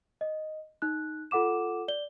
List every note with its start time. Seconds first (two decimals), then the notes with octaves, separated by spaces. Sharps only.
0.21 D#5
0.82 D#4 F#6
1.31 F4 A4 F#5 D6 E7
1.88 D5 G7